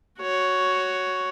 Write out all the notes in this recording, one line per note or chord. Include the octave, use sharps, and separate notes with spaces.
F#4 C#5